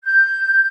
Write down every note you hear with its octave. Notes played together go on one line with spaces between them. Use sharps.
G6